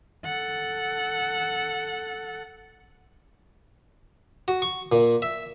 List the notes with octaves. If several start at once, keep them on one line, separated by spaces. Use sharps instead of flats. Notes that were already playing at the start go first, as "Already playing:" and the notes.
A4 F#5
F#4
C#6
A#2
E5